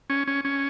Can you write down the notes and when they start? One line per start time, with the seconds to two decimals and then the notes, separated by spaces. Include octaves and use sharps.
0.10 C#4
0.28 C#4
0.45 C#4